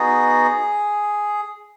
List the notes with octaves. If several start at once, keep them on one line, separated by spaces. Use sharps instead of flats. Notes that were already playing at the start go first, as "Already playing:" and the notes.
Already playing: B3 D#4 F#4 G#4